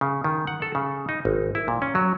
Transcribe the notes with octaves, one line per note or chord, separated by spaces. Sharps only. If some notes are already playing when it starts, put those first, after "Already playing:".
C#3
D#3
F#5
A4
C#3
D#4
G#1
E4
A#2
C#4
F#3